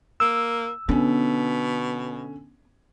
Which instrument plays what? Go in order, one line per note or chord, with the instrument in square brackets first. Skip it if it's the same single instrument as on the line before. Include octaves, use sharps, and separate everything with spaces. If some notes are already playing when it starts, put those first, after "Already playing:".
[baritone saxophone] A#3 [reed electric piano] E6
[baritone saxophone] B2 [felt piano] D3 C#4 [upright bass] B3